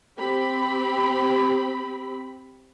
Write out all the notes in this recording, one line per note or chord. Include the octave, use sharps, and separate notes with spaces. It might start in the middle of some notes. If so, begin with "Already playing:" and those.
C4 G4 B5